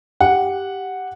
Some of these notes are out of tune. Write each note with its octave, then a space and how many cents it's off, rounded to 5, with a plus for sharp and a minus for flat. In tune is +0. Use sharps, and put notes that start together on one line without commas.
G4 +0 F#5 -5